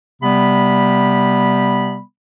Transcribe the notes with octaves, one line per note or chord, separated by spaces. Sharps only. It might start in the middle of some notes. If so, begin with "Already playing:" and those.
C3 G3 B3 B5